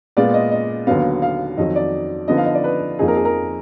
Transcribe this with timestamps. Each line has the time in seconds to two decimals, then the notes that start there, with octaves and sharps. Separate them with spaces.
0.17 A#2 G#3 B3 F4 D5
0.34 D#5
0.51 D#5
0.87 D#2 D3 F#3 B3 F5
1.22 F5
1.57 F2 D#3 F#3 D#5
1.75 D5
2.28 D3 F3 B3 D#4 D#5
2.37 F5
2.46 D#5
2.55 D5
2.64 B4
2.99 F2 F3 A#3 D#4 G#4
3.08 A#4
3.17 G#4
3.25 A#4